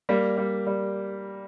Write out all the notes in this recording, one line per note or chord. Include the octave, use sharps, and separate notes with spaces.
G3 A#3
G3
G3